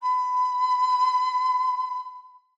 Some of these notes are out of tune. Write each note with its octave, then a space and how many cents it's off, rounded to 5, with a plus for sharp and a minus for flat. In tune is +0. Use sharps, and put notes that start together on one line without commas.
B5 +25